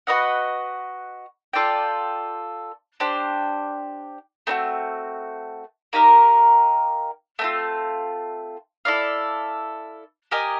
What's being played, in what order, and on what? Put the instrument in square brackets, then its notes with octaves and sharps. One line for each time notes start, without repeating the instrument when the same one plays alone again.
[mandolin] F#4 B4 D#5 F#5
F4 A4 D5 G5
D4 G4 C5
A3 C4 D#4 F#4
A#3 D#4 G4 A#4
A3 C4 F4
E4 A4 D5 F5
G4 A#4 D#5 G#5